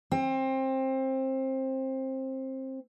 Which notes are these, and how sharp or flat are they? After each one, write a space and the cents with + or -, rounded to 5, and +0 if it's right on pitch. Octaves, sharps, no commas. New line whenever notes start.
C4 +20